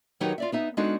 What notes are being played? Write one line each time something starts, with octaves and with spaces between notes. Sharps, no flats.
D#3 F#3 D#4 G4 B4 C#5
F4 D5 E5
B3 D#4 E5
G#3 B3 D4 D#4 F#4 A4